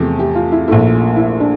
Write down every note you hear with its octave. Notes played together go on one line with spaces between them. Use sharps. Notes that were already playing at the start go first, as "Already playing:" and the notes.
Already playing: E2 C3 F3 A3 G4
G4
F4
E4
A#1 A#2 A3 E4
E4
D4